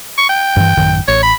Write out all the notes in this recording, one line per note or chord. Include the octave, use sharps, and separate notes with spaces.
C#6
G5
G2 E3
A1 F#2 D#3
A1 C#5
B5